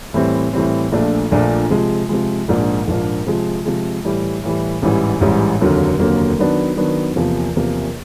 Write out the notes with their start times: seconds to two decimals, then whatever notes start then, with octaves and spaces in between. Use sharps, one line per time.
0.14 A2 E3 G3 C4
0.53 A2 E3 G3 C4
0.92 A#1 A#2 F3 A3 D4
1.31 A#1 A#2 F3 A3 D4
1.70 C3 F3 G#3
2.09 C3 F3 G#3
2.48 A#1 G#2 F3 A#3 D4
2.87 A#1 G#2 F3 A#3 D4
3.27 C3 F3 G#3
3.65 C3 F3 G#3
4.04 A2 E3 G3
4.43 A2 E3 G3
4.82 A1 G#2 E3 G3
5.21 A1 G#2 E3 G3
5.60 F1 D#2 D3 F#3 A#3
5.99 F1 D#2 D3 F#3 A#3
6.39 D#3 F#3 B3 D4
6.77 D#3 F#3 B3 D4
7.16 E2 C3 F3 A#3
7.56 E2 C3 F3 A#3